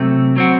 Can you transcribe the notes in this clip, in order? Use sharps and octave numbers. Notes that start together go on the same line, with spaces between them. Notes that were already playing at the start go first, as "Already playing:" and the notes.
Already playing: C3 F#3 A3 C4
F#3 C4 F#4